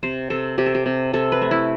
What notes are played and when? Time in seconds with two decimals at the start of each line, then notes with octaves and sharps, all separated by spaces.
0.03 C3 C5
0.30 C3 A4
0.58 C3 G4
0.66 A4
0.75 G4
0.86 C3
1.13 C3 A4
1.32 B4
1.42 A3
1.51 E4